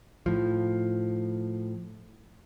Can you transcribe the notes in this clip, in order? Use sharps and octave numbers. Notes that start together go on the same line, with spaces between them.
A2 F3